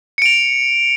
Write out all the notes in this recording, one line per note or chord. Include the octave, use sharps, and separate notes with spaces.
C#7 D7 F7